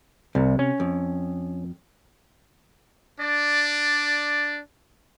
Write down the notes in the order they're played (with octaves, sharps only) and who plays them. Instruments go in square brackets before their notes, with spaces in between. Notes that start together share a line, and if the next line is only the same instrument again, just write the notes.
[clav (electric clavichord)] C2 [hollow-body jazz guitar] C3
[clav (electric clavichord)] C#4
[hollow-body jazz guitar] F2
[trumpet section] D4 D5